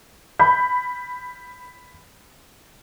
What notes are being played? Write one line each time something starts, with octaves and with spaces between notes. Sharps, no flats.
B5 G6